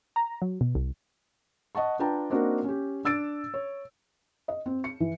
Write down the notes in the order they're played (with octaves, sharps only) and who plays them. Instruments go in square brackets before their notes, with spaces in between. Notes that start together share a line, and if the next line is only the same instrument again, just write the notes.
[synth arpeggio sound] A#5
F#3
B2
C2
[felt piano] D#5 F#5 A5 C#6
D4 F4 B4 G5 A5 A#5
A#3 C4 D4 D#4 F#4 A#4
C#4 G4
D4 E6 A6 D7
C#5
D#5
C4
C#7
E3